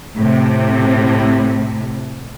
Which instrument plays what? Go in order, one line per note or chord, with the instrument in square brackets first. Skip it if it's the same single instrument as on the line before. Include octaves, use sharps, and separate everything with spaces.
[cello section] A2 C3